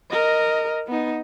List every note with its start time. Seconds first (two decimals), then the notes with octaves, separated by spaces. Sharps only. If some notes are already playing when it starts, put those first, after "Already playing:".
0.11 A#4 D#5
0.87 B3 D#4